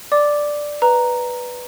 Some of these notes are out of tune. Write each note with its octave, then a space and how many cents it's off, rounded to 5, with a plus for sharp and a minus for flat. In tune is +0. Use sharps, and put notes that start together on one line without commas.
D5 +5 D6 +0
B4 +0 A#5 +0